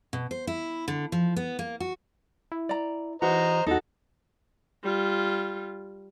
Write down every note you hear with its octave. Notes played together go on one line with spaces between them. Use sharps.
B2
C5
E4
D3
F3
B3
A#3
F#4
E4
D5 A#5
E3 F#4 C5 D#5 A#5
E2 D#4 F#4 A4
G3 F4